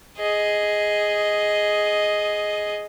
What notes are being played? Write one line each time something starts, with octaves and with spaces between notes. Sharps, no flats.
G#4 D#5